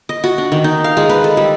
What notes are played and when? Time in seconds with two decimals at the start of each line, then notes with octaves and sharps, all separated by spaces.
0.09 D#5
0.24 F#4
0.38 D4
0.52 D#3
0.64 D#4
0.84 F5
0.97 G#3
1.09 B4
1.24 A4
1.37 G3